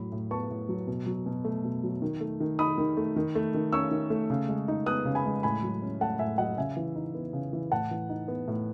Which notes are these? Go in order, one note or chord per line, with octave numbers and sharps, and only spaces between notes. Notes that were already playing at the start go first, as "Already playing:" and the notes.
Already playing: A2 F#3 B5
A2
B3 A5 C#6
A2
F#3
B2
F#3
B2
A3
B2
F#3
D#3
A3
D#3
D#4 B5 D#6
D#3
A3
D#3
A3
D#3
C#4 C#6 E6
D#3
A3
C#3
G#3
D#4
B3 D#6 F#6
C#3
G#5 B5
G#3
A2 G#5 B5
F#3
C#4
A3 F#5 A5
A2 E5 G#5
F#3 D#5 F#5
C#3 E5 G#5
E3
D#4
B3
C#3
E3
A2 F#5 A5
E3
D#4
B3
A2